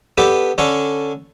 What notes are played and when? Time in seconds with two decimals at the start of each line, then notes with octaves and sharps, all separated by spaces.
0.18 B3 D4 G4 A4 B4
0.58 D3 C#4 D4 A4 C#5